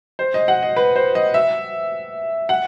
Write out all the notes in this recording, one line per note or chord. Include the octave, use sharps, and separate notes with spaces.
C5
D#5
F#5
D#5
B4
C5
D#5
E5
F#5